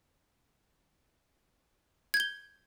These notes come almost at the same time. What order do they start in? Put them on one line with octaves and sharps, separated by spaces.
G#6 G6 G7